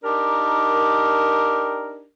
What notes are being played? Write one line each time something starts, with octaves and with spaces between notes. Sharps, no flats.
D4 D#4 G4 A#4